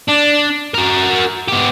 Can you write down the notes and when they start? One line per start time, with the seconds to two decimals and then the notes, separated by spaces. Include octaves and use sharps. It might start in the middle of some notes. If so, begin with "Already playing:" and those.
0.08 D4
0.74 F#4 A#4
1.48 B3 G4